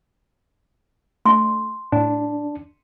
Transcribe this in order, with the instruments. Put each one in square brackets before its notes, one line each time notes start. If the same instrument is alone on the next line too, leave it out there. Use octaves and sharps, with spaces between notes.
[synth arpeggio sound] A3 D4 [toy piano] C6
[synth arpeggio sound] A2 [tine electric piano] D4